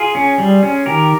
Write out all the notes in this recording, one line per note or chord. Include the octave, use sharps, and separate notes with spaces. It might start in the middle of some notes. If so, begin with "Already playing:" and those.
Already playing: F4 G#4
C#4
G3
C#4
D#3 G4 A#4